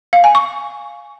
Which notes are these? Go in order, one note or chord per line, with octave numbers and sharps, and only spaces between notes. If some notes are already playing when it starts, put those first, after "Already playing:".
F5
G#5
C#6